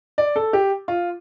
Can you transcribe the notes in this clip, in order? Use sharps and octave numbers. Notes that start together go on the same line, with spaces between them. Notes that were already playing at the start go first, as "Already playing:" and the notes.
D5
A4
G4
F4